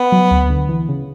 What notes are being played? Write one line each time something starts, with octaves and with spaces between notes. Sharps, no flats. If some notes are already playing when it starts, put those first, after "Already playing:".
Already playing: B3
F#3
D2
D3
E3
C#3